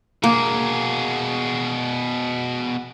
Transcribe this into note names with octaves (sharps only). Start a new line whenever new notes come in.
B2 A#3 G#4